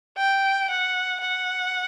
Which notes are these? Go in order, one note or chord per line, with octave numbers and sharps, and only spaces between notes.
G5
F#5
F#5